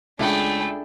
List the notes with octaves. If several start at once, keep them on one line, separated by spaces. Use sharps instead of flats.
C#2 A3 D4 G#4 G5 B5